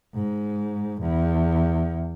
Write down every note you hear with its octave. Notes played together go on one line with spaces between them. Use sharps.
G#2
E2